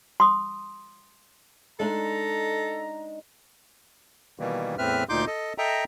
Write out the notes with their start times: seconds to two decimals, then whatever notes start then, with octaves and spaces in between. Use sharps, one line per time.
0.20 C6 D#6
1.80 G#3 D4 D#4 A4 A#5
4.39 B2 D#3 E3 G3 A#3
4.78 E2 A2 C4 B4 E5 F6
5.09 D2 A#2 D#4 C6 D6 G6
5.27 A4 D#5
5.58 A4 D#5 E5 G5 A#5